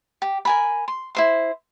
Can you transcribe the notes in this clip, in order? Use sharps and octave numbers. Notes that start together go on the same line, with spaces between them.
G4
A#4 G#5 B5
C6
E4 C5 C6